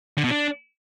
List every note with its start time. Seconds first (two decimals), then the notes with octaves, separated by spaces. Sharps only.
0.18 D3
0.24 B2
0.31 D4